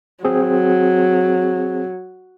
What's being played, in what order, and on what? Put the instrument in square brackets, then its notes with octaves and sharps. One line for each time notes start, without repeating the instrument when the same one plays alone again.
[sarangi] F#3 [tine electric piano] C4 G#4